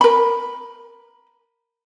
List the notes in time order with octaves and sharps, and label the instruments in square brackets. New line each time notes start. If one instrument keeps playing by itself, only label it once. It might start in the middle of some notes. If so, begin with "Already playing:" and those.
[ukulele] A#4 B5